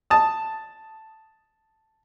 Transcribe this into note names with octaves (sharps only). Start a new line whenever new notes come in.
A5 D#6